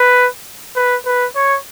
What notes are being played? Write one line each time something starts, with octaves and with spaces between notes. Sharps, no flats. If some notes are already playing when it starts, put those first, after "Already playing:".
Already playing: B4
B4
B4
C#5